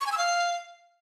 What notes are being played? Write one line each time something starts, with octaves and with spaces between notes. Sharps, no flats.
C#6
G#5
E6
F5